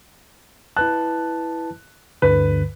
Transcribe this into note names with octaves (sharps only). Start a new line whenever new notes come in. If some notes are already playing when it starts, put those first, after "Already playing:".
E4 B4 A5 F#6
D2 G2 D3 B4